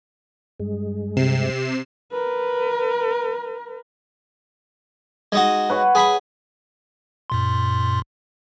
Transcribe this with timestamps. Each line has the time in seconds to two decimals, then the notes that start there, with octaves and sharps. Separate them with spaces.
0.60 G2 G#3
1.17 C3 C7 E7
2.12 A#4 B4
5.32 G#3 D#4 F#4
5.70 B4 C#5 F#5
5.95 G#4 B5 C#6
7.30 F#2 A#2 C6